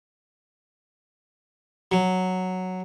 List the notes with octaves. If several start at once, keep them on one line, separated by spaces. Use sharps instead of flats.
F#3